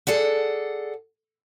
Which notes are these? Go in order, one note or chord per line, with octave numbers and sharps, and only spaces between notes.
G#4 A4 D5 F#5